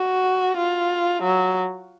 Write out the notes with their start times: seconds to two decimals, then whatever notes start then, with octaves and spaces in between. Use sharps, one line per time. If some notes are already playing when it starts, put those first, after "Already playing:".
Already playing: F#4
0.57 F4
1.23 F#3